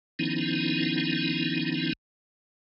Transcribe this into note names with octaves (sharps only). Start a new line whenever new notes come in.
D#3 F3 B3 C#4 D#4 E4